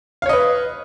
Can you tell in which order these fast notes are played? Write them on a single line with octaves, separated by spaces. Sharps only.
F5 C#5 D#5 B4